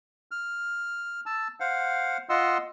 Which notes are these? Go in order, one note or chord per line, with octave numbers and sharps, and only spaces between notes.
F6
A5 E6
C5 F5 F#5
F4 D#5 F#5 C6 E6